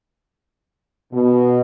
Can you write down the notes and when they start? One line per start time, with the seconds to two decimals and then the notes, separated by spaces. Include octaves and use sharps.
1.13 B2